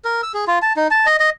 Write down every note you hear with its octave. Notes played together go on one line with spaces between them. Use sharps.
A#4
E6
G#4
F4
A5
D#4
A5
D#5
D#5